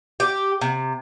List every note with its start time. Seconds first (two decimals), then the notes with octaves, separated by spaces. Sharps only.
0.20 G4
0.61 C3